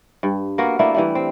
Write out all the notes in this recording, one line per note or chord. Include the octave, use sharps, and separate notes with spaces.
G2
A#3 B3 F#4 A#4
A3 A#3 D4 E4
E3 G3 A3
C4